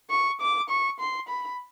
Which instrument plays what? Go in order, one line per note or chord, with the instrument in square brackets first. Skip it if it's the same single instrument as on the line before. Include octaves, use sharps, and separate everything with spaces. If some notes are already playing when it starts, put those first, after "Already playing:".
[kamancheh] C#6
D6
C#6
C6
B5